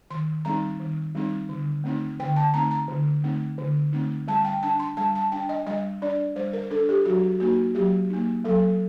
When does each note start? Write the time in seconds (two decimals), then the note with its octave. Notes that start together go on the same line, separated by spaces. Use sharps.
0.10 D#3 C6
0.45 G3 C4 D#4 A#5
0.80 D#3
1.15 G3 C4 D#4
1.49 D3
1.84 A3 C4 D#4
2.20 D3 G5
2.36 A5
2.53 A3 C4 D#4 A#5
2.71 A#5
2.88 D3
3.24 A3 C4 D#4
3.58 D3
3.93 A3 C4 D#4
4.28 G3 A5
4.45 G5
4.63 D4 A5
4.79 C6
4.97 G3 A5
5.15 A5
5.32 D4 G5
5.49 D#5
5.66 G3 D#5
6.02 D4 D5
6.36 G3 C5
6.53 A#4
6.71 D4 A4
6.89 G4
7.05 F#3 F#4
7.40 A#3 D#4 F#4
7.75 F#3 G4
8.10 A#3 D#4
8.45 F#3 A4